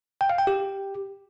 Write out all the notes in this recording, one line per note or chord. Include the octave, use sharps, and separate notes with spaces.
G5
F5
G5
G4